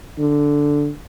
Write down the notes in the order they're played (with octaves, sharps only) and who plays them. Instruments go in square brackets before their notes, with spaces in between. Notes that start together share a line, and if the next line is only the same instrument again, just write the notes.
[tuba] D3